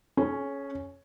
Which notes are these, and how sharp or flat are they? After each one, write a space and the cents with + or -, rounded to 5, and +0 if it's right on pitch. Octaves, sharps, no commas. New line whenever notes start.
C#4 +0 G#4 +45